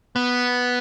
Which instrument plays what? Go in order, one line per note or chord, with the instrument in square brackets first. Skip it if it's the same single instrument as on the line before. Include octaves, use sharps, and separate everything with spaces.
[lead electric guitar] B3